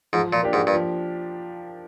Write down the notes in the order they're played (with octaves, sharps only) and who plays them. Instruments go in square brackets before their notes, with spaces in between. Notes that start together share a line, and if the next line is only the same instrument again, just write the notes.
[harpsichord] G#2 [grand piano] F3
[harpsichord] A#2
[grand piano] A#3 D4 G4
[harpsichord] G#2
G2
[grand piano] F3